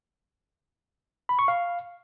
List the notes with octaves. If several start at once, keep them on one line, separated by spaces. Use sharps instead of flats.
B5
C#6
F5